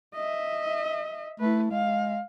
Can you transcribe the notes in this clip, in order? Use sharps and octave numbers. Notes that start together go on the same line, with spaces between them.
D#5 E5
A3 E4 B4
G#3 F5